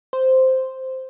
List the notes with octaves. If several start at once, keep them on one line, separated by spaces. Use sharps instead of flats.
C5